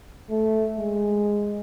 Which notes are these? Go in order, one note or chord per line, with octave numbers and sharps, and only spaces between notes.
A3
G#3